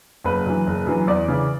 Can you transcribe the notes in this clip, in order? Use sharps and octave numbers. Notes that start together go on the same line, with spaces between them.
F#1 B4
F#2 E3
F#1
F#2 E3
E2 D5
C#3 E3